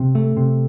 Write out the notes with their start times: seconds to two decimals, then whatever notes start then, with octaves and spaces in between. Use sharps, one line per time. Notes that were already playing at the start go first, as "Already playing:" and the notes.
Already playing: C3
0.15 A3
0.37 C3